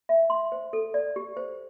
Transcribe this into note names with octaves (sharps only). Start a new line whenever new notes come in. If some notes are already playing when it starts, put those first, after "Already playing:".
E5
C6
C5
A4
D5
G4
C5